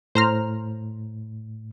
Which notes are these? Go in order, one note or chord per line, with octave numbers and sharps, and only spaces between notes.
A2 C5 A#5 F6